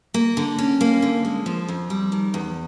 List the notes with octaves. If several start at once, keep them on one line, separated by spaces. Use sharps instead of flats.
A#3
D3
C#4
A#3
D3
G#3
F3
F2
G3
D#3
E2